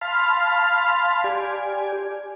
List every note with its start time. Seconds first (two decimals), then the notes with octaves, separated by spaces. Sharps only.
0.01 F5 A5 B5 C6 F6
1.24 G4 D5 G#5